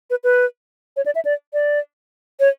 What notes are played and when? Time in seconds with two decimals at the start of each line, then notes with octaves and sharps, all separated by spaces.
0.10 B4
0.24 B4
0.97 C#5
1.06 D5
1.15 E5
1.25 D5
1.53 D5
2.40 C#5